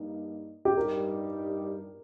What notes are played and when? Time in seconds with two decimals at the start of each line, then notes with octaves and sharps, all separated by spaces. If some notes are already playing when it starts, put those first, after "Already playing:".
Already playing: G2 G3 A#3 D#4
0.65 G4
0.77 G2 G3 D#4 G4 A#4